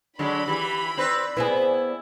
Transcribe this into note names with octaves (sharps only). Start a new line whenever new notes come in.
D3 F#3 G#3 D4 B5
E3 G4
C4 B4 D5
B3 C4 E4 G#4